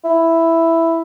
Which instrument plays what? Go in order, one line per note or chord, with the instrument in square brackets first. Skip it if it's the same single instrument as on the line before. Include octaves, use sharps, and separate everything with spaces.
[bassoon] E4